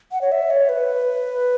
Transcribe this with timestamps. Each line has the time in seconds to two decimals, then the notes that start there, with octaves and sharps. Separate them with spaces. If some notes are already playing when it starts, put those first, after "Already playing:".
0.12 F#5
0.21 C#5
0.32 E5
0.50 C#5
0.69 B4